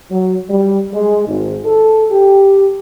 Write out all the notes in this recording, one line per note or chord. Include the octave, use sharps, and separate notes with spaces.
F#3
G3
G#3
G#1
A4
G4